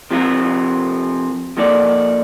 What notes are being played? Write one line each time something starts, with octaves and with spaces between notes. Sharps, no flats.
C3 F3 C4 F4 A#4
F3 A#3 D#4 A4 D5